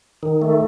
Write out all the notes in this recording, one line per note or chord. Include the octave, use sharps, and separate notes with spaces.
D#3
A3